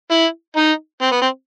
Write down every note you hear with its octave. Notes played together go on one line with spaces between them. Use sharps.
E4
D#4
C4
B3
C4